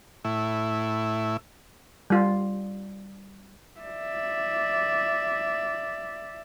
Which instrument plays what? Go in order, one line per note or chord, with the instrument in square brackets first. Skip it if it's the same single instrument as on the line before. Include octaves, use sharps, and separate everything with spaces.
[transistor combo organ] A2 E4
[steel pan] G3 F4
[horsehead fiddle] D5 E5